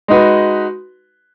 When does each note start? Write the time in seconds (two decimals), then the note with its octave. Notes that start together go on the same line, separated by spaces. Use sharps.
0.08 G#3 D#4 F#4 B4